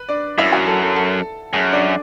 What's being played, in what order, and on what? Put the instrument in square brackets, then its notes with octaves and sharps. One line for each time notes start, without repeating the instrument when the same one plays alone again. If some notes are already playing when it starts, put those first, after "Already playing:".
Already playing: [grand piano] B4
D4 D5
[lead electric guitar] F#2 [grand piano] E4 E5
[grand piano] F#4 F#5
A4 A5
A4 A5
A4 A5
[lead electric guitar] F#2 [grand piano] G#4 G#5
[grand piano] D4 D5